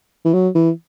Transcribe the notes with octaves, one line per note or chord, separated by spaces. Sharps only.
E3
F#3
E3